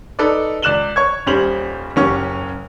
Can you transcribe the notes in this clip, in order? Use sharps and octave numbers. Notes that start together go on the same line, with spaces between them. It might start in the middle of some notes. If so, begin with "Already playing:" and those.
D#4 A4 B4 D5
C#2 D5 F#6 E7 F#7 G7
C#5 C#6 G#6
D#1 G3 C#4 C5 F7 F#7
F#1 F#3 C#4 G4 C#6 F6